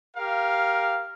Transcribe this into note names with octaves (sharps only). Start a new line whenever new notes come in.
G4 A#4 F5